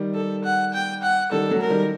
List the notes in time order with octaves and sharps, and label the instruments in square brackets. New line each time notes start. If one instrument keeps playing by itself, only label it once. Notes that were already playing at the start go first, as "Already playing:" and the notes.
Already playing: [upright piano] D#3 G3
[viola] A4
F#5
G5
F#5
[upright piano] D#3 G3 [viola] A4
[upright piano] F#3 A3
[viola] A#4
[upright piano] D#3 G3